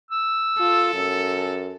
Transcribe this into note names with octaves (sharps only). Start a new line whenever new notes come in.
E6
F4 A4
F#2